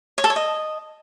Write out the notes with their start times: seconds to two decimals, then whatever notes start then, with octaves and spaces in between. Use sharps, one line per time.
0.18 C#5
0.24 A4
0.30 C#5
0.36 D#5